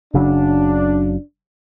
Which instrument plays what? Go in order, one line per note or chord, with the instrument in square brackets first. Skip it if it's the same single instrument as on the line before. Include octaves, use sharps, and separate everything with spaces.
[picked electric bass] F#1 C#3 F#3 [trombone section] D4